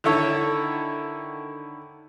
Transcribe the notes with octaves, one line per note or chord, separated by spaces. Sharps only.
D3 D#3 E4 A4 C#5